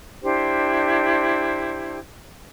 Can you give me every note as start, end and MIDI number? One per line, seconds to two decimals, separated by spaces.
0.23 1.99 62
0.23 1.99 64
0.23 1.99 67
0.23 1.99 72